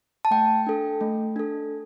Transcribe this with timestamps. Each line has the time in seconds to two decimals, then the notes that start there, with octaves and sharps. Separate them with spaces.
0.25 A5
0.31 A3 G5
0.67 D4 A4
1.01 A3
1.36 D4 A4